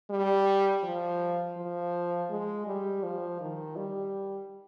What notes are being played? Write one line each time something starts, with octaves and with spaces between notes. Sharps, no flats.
G3
F3
F3
G#3
G3
F3
D#3
G3